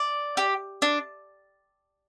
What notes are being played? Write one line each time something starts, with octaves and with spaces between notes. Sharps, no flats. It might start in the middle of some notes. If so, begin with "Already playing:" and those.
Already playing: D5
G4
D4